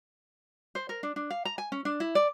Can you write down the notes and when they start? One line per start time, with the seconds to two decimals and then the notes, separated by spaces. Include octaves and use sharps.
0.75 C5
0.89 A#4
1.03 D4
1.16 D4
1.30 F5
1.45 A#5
1.58 G#5
1.72 C#4
1.85 D4
2.00 E4
2.15 D5